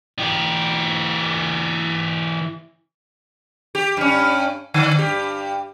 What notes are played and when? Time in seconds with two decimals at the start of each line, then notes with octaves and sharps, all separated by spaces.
0.19 E3 G4
3.75 G4
3.97 G2 C#4
4.74 D3
4.98 G2 G4